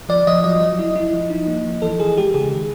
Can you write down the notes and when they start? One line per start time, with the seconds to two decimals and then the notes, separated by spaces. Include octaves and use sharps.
0.09 F3 D5
0.27 F3 D#5
0.44 F#3 D#5
0.61 F#3
0.79 E4
0.96 E4
1.13 F3
1.30 D#4
1.47 A#3
1.65 F3
1.82 E3 A4
2.00 E3 G#4
2.17 G#3 G4
2.34 C#3 G#4
2.51 D#3